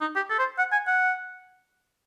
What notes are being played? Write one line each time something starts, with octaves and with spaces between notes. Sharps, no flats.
D#4
G4
A4
C5
F#5
G#5
F#5